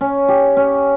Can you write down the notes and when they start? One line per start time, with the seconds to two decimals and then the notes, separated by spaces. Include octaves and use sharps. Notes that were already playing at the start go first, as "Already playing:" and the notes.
0.01 C#4
0.29 G4
0.57 C#4